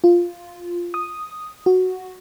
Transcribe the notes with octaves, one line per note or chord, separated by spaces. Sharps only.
F4
D#6
F#4